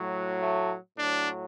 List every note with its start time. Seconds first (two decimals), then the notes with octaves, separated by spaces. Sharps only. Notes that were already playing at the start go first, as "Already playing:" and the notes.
Already playing: A2 F#3
0.42 A3
0.98 A2 F#3 D4